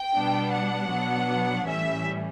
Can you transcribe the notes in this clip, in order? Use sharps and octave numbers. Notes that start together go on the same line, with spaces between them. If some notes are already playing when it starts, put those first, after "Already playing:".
Already playing: G5
B2 G3 B3 D4
F#5
B2 F#3 B3 D4
A2 E3 G3 C#4 E5